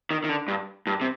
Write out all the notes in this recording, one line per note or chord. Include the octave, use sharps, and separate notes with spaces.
D#3
D#3
D3
G2
G2
C3